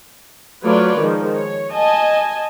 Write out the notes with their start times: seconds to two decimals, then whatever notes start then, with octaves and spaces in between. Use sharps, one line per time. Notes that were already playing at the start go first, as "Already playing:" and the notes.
0.63 F#3 A3 F4 B4 C#5 D5
0.98 D#3 F3 G#3
1.35 C#5
1.74 D#5 G#5 A5